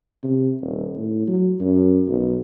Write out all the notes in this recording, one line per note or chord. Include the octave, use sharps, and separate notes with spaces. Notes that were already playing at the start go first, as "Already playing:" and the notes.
C3
D#1
A2
F#3
F#2
B1